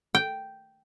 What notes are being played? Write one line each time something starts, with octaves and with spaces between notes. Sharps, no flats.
G5